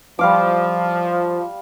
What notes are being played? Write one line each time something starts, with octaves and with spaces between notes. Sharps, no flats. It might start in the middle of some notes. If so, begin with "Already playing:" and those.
F3 G3 F5 D6